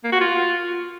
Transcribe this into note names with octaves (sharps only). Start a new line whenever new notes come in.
A#3
F#4
F4